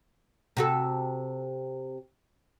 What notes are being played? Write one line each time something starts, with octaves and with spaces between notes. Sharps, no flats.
C3 F#4 A4